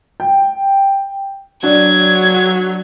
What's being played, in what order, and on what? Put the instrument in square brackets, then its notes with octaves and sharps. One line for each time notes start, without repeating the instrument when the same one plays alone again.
[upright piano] G5
[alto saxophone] F#3 [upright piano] D4 [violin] G#6